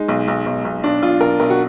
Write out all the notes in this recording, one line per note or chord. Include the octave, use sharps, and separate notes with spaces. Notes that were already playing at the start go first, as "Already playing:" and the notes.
Already playing: G#3 D#4
B1
B1
B1
B1
B1 D4
B1 F4
B1 A#4
B1 A#4
F#4